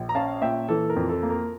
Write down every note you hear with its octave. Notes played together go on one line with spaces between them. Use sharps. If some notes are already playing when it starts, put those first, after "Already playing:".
Already playing: A#1
A#5
C#4 F5 A5
A#2 E5 G5
E3 A4
A#4
F2
A4
A#3
A#4